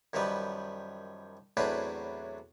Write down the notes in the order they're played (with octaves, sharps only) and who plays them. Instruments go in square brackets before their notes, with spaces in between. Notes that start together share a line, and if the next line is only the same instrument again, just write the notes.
[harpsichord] F#2 D#3 F3 G3 B4
E2 A2 F#3 C4 D4 B4